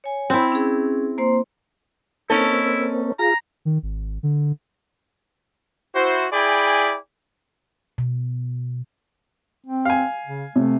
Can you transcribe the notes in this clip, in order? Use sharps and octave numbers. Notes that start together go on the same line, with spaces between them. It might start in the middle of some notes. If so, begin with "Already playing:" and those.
C#5 G#5
C4 E4
C#4 G#4
A#3 C5 C6
A#3 C4 C#4 D#4 E4 A4
F4 G#4 A#5
D#3
G#1
D3
E4 F#4 C5
E4 G#4 D5 G5 G#5 B5
B2
C4
F5 G#5
C#3
C3 A3